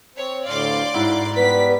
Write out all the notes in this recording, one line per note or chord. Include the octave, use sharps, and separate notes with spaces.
C4 C#5
D2 A2 D5 F5 C6 D6
G#2 E4 F#5
G3 B3 B4 B6